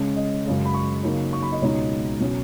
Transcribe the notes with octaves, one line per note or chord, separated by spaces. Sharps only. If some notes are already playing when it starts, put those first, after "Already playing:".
Already playing: C#3 G#3 C#4
D#5
F#2 C#3 G#3
B5
C#6
C#3 F#3 A#3 D#4
C#6
B5
D#5
C#2 B2 G#3 D#4 C#5
B2 F#3 C#4